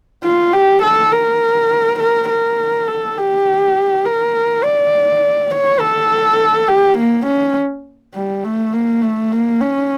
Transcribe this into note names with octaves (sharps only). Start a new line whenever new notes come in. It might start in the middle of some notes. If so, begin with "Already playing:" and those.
F4
G4
A4
A#4
A#4
A#4
A4
G4
A#4
D5
C#5
A4
G4
A#3
C#4
G3
A3
A#3
A3
A#3
C#4